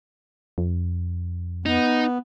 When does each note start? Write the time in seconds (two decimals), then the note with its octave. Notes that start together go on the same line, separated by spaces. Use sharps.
0.58 F2
1.66 B3 D#4